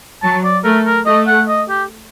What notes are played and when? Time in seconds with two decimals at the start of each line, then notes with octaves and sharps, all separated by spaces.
0.22 F#3 A5
0.44 D5
0.64 A3 A#4
0.85 A#4
1.06 A3 D#5
1.27 F#5
1.48 D#5
1.69 G4